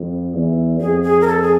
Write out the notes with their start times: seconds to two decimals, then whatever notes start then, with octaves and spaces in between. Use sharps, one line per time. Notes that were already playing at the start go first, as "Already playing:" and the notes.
Already playing: F2
0.34 E2
0.80 F2 G#4
1.03 G#4
1.21 A#4
1.27 A4
1.42 G#4